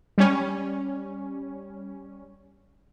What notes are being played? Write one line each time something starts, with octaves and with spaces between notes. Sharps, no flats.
G3 C#4